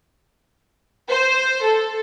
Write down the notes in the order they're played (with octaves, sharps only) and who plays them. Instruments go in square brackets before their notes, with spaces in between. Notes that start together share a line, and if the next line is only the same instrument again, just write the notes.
[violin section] C5
A4